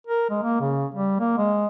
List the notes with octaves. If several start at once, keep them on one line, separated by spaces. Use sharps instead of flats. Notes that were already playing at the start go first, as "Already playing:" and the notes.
A#4
G#3
A#3
C#3
G3
A#3
G#3